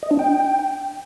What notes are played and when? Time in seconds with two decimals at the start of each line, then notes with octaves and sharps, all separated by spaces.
0.03 D#5
0.11 D4
0.19 G5